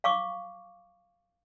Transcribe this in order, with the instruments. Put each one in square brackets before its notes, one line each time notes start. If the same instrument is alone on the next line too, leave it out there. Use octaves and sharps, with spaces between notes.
[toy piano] F5 C#6 D6